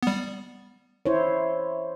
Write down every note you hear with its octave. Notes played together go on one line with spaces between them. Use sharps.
G3 B3
E4 C5 C#5